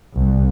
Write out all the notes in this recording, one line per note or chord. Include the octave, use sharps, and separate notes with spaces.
C2